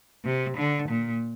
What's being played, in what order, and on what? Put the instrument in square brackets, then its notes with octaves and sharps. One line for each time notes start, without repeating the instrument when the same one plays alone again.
[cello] C3
D3
A#2